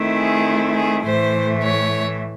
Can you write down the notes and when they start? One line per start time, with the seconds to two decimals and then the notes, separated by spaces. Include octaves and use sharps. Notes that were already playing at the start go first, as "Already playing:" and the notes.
Already playing: D#3 A3 C4 E4
0.17 G#4
0.75 G#4
1.04 A2 E3 A3 C5
1.62 C#5